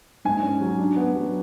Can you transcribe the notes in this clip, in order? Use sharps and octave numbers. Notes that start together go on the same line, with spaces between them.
G#2 G#5
C#4
F#3
D4
B3
F#3